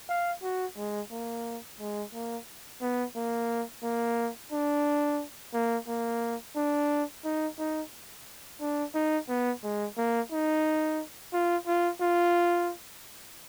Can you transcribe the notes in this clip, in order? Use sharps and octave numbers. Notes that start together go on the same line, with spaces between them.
F5
F#4
G#3
A#3
G#3
A#3
B3
A#3
A#3
D4
A#3
A#3
D4
D#4
D#4
D4
D#4
B3
G#3
A#3
D#4
F4
F4
F4